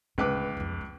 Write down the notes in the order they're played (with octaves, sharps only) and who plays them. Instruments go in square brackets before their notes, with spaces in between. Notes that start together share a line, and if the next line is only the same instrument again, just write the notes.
[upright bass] D1 D3 [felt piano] C#2 B4 D6
[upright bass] B1 F2
G#3